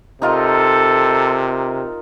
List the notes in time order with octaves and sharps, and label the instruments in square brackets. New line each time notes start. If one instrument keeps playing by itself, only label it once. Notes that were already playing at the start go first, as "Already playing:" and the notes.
[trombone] C3 [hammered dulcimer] D#4 F4 A#4 [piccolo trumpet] A4